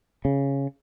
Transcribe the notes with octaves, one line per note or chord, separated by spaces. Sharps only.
C#3